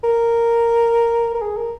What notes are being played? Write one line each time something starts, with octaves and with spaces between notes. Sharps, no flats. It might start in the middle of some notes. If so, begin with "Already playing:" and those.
A#4
A#4
G#4
A#4